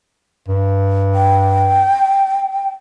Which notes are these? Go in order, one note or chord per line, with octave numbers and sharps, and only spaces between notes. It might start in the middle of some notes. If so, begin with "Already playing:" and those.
G2
G5